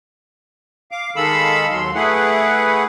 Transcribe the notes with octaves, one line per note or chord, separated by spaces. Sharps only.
F5 D6
D#3 G#3 A4 F5 B5 E6
D#2 F#3 C6
A3 E4 G#4 B4 F#5